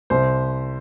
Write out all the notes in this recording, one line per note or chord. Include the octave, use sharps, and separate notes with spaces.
C2 C5